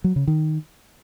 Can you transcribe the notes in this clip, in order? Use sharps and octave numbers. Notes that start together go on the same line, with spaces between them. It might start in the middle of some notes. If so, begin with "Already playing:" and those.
F#3
C#3
D#3